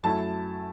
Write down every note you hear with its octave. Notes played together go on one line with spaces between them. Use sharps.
F#2 F#3 A3 E4 A5